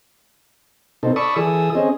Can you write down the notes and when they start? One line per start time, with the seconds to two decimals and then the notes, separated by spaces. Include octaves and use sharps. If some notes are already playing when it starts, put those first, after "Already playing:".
1.03 B2 C4 D#4 A4
1.16 D5 A5 B5 C#6 D#6 E6
1.36 E3 G#4 A4 D#6 E6
1.75 C4 C#4 G#4 D#5